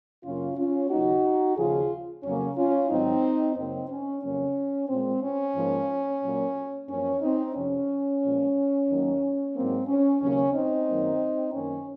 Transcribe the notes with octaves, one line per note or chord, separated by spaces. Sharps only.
F#2 C#3 F#3 A#3 C#4 F4
C#4 F4
D#2 C#3 F#3 A#3 D#4 F#4
D#2 C#3 F3 F4 G#4
F2 C#3 F#3 A#3 C#4
C#4 F4
G#2 D#3 F#3 C4 D#4
F#2 C#3 F#3 A#3 C4 D#4
C#4
F2 C#3 F#3 A#3 C#4
A#2 G#3 C4
C#4
G#2 F3 A#3
A#2 F#3 A#3
F#2 F3 A#3 C#4
C4 D#4
F2 C3 F3 C#4
A#2 F3 G#3
D#2 D#3 F#3 A#3
G#2 F#3 A#3 C4
C#4
D#2 C#3 F#3 A#3 C#4
C4 D#4
F#2 D#3 F#3 A#3
F#2 D#3 A#3 C#4